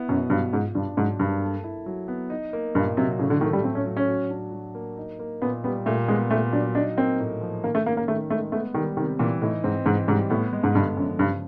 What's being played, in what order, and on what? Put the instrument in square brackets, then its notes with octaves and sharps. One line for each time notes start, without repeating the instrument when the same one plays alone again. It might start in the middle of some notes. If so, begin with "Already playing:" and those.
Already playing: [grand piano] B3 E4
[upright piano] F#2 [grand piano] B2
[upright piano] G2 [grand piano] F#3
[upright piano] G#2 [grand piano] F4
[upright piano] G2 [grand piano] D4
[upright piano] G#2 [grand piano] F#3
[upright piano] G2 [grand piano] A#3
[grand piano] A4
E4
F#3
B3
D#4
A#3
[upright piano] G2 [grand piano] A#2
[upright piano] C3 [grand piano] F#3
[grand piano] A2 [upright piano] C#3
[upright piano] D3
[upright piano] D#3 [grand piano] A3
[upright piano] G3
[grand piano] A2 [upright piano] C4
[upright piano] C#4
[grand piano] F#3
[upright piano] C#4
[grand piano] F#4
D4
F#3
A#3
D#4
A#3
[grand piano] A#2 [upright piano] B3
[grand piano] G3 [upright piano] B3
[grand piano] A#2 [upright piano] A3
[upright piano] G#3 [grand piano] B3
[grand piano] A#2 [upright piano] A3
[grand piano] F#3 [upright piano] D4
[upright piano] D4 [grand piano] D#4
[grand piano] A#3 [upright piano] C4
[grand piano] A2
F3
[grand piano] D#3 [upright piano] A#3
[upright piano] A3
[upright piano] A#3 [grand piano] C#4
[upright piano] A#3
[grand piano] D#3 [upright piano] A3
[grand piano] G#3 [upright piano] A3
[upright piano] A3 [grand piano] B3
[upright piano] D#3 [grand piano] G3
[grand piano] C3 [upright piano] D#3
[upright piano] A#2 [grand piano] E3
[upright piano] A2 [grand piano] D#4
[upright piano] G#2 [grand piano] C4
[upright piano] G#2 [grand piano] E3
[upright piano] G#2 [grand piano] G3
[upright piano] A2 [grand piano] B3
[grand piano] G#3
[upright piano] G#2
[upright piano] G2 [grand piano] D3
[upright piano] F#2 [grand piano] F3
[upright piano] G2 [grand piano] C#3